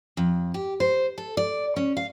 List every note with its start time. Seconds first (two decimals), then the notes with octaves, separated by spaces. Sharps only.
0.17 F2
0.54 G4
0.80 C5
1.18 A4
1.37 D5
1.76 C#4
1.97 F5